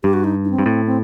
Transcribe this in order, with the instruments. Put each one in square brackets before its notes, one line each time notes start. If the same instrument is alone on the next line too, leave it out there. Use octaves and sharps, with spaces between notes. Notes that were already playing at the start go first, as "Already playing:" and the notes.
[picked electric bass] G2 [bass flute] G4
[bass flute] F#4
D#4
D#4
C4
[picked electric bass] G2
A2
[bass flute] C4